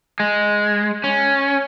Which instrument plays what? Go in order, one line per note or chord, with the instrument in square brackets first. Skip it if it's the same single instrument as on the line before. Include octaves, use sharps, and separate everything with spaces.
[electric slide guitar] G#3
C#4